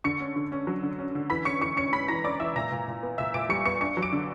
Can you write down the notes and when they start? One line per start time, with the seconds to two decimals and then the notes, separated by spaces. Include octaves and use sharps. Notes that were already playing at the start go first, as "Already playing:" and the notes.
0.04 D3 C#6 C#7
0.20 C#4
0.36 D3
0.52 C#4
0.67 F#3
0.83 D3
0.98 C#4
1.15 D3
1.30 E3 B5 B6
1.45 C#4 C#6 C#7
1.61 E3 C#6 C#7
1.77 C#4 C#6 C#7
1.93 C#4 B5 B6
2.08 E3 A#5 A#6
2.24 C#4 D5 D6
2.40 E3 E5 E6
2.56 A#2 A#5 A#6
2.71 A#2
2.88 A#2
3.03 B3
3.18 A#2 E5 E6
3.34 A#2 D6 D7
3.49 G3 C#6 C#7
3.65 B3 C#6 C#7
3.81 D4 C#6 C#7
3.97 F#3
4.02 D6 D7
4.13 D3